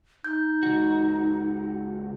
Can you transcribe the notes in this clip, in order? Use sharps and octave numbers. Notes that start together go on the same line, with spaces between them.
D#4 G6
C#2 F#4